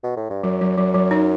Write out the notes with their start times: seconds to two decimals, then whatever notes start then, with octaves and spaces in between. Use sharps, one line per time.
0.03 B2
0.16 A2
0.30 G2
0.43 F#2 F#3
0.61 F#3
0.77 F#2 F#3
0.94 F#3
1.11 D#4